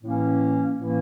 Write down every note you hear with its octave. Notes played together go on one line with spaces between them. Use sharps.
A2 E3 A#3 C#4
A2 E3 A#3 C#4